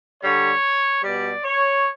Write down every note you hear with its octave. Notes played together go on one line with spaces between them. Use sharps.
D3 G3 C#5
B2 G3 D5
C#5